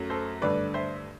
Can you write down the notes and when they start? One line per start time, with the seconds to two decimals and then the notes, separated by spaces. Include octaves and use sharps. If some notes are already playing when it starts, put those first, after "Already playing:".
Already playing: F#2 F#3 A3
0.10 A4 C5
0.41 G2 D3 A3 B4 D5
0.74 C5 E5